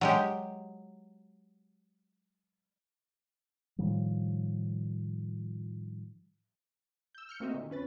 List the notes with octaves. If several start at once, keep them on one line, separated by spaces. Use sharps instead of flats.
F#3 G#3 G4
A2 D#3 F3 G3
E6 G6
F6 G6 C#7
A3 A#3 C4 F#4 D#5 E5
A#2 D3 D#3
F2 C#4 B4 A6